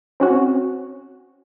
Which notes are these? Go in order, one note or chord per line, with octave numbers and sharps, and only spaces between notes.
C4 C#4 F#4